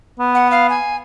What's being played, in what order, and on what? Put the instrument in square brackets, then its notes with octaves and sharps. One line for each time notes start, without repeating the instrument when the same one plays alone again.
[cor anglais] B3
[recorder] F#5
F5
G#5